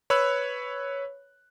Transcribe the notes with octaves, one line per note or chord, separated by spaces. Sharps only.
B4 C#5 B5 E6 F#6